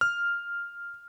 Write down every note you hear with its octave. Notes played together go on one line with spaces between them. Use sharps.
F6